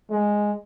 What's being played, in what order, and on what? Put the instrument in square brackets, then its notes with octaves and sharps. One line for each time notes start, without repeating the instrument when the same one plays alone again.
[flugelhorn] G#3